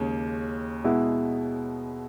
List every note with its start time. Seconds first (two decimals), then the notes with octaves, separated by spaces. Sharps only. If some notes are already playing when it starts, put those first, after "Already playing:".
Already playing: D#2 C#3 G#3
0.84 B2 G#3 B3 E4